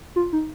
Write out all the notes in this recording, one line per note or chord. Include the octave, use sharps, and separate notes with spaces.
F4
D#4